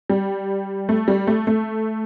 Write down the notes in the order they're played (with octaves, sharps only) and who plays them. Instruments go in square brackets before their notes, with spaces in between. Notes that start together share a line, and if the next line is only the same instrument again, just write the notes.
[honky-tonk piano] G3
A3
G3
A3
A3